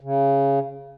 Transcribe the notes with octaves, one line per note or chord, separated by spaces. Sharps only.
C#3